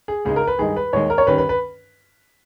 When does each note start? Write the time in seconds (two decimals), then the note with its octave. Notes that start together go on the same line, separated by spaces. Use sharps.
0.08 G#4
0.25 C#2 C#3 G#3 D#4 G#4
0.36 A#4
0.47 B4
0.59 G2 D#3 G#3 D#4 G#4
0.76 B4
0.93 D#2 D#3 G#3 C#5
1.10 A#4
1.18 C#5
1.27 G2 D#3 G3 C#4 B4
1.38 B4
1.49 B4